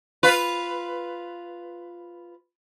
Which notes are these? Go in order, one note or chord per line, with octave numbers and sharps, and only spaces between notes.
F4 B4